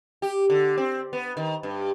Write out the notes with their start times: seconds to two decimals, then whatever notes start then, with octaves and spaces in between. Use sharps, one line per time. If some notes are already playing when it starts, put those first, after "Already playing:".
0.22 G4
0.50 D3
0.78 C4
1.13 B3
1.37 D#3
1.63 G2